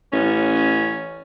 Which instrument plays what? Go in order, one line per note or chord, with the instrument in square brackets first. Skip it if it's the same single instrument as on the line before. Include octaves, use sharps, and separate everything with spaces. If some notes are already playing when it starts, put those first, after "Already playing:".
[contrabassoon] A1 [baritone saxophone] C#4